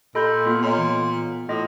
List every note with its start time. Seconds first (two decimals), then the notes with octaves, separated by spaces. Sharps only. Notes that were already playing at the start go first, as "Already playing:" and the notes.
0.15 A#2 G4 A4 D#5 B5 G6
0.46 A#3 B3 F4
0.62 A#2 A4 C#5 D#5
0.77 E3
1.49 A2 F4 D#5